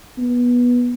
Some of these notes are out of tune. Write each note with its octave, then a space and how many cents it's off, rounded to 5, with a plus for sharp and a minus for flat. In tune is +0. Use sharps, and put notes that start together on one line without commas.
B3 -15